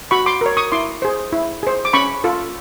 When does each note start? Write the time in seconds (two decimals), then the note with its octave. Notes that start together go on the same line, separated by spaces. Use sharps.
0.11 F#4 B5 C#6
0.26 C6 D6
0.41 A#4 C#5
0.57 C#6 D#6
0.72 E4 C6 D6
1.02 G#4 C5
1.32 E4
1.63 G#4 C5
1.85 D6
1.93 C#4 B5 C#6
2.24 F4 A4